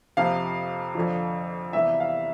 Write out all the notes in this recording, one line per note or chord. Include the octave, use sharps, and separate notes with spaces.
F2 C3 F3 F5
F2 D3 F3
E2 C3 G3 E5
F5